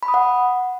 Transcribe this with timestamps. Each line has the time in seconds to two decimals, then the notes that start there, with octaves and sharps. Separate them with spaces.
0.03 B5
0.08 D#6
0.14 F#5